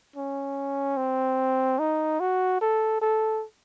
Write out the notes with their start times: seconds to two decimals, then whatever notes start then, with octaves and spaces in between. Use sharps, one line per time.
0.16 C#4
0.97 C4
1.79 D#4
2.20 F#4
2.61 A4
3.01 A4